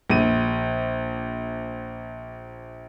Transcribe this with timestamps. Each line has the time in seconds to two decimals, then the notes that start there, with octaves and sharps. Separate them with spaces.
0.10 A#1 D#7